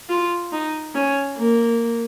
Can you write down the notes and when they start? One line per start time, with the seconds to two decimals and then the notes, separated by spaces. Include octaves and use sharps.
0.09 F4
0.52 D#4
0.95 C#4
1.37 A#3